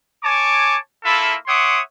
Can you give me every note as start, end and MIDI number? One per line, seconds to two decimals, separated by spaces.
0.24 0.77 73
0.24 0.77 80
0.24 0.77 81
0.24 0.77 86
1.05 1.34 58
1.05 1.34 64
1.05 1.34 65
1.05 1.34 69
1.05 1.34 76
1.05 1.34 83
1.47 1.79 73
1.47 1.79 76
1.47 1.79 78
1.47 1.79 84
1.47 1.79 86
1.47 1.79 87